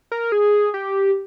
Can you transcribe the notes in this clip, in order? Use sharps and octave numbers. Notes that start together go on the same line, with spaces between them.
A#4
G#4
G4